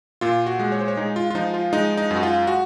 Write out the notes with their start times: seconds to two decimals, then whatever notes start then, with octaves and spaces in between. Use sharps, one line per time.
0.21 A#2 F4
0.47 F#4
0.59 G#3
0.72 C#5
0.80 C5
0.88 C#5
0.97 G#3 D#4
1.16 F4
1.30 F4
1.35 F3 D#4
1.54 F4
1.73 G#3 D#4
1.97 D#4
2.11 F#2
2.16 F#4
2.23 F4
2.47 F#4